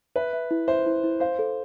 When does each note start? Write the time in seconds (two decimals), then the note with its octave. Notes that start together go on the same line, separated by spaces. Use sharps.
0.16 B4 E5
0.33 E5
0.51 E4
0.68 C5 E5
0.86 E4
1.04 E4
1.20 C5 F5
1.39 A4